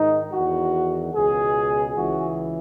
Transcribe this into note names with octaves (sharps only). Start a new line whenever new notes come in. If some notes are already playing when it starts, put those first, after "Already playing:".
Already playing: G#2 D#3 D#4
E2 D#3 F#4
C#2 B2 G#4
C#2 C#3 E3 F#4